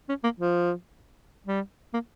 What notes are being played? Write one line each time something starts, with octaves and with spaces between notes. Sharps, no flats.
C#4
A#3
F3
G3
A#3